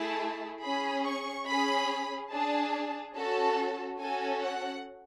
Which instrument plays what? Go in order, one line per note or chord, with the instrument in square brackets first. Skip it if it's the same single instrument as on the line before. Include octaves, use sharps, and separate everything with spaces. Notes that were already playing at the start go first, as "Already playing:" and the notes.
Already playing: [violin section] A3 E4 G#4 A5
C#4 G#4 B5
C#6
C#4 G#4 B5
D4 G#4 A5
C#4 F#4 A4 A5
C#4 F#4 A4 G#5
F#5